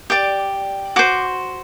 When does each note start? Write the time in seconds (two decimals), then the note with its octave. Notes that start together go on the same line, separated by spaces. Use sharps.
0.10 G4 D5 D6
0.96 F#4 C5 D6